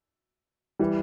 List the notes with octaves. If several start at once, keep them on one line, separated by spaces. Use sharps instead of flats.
E3 G3